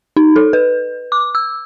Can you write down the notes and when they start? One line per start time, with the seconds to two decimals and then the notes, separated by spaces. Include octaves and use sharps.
0.17 D#4
0.36 A4
0.53 B4
1.12 D6
1.35 E6